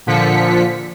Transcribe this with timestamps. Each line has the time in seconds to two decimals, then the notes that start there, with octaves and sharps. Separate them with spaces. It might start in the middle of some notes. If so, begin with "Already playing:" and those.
0.06 A#2 D3 F3 B6 C#7